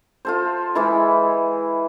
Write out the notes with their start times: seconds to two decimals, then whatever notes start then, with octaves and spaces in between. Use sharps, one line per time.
0.25 F4 A4 C5
0.75 E3 G#3 E4 B5